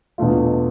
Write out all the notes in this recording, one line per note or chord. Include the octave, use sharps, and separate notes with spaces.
E2 B2 A3 D4 F4